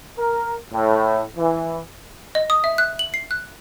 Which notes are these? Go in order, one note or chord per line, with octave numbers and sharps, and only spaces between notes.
A#4
A2
E3
D#5
D#6
E5
F#6
F#7
C7
F#6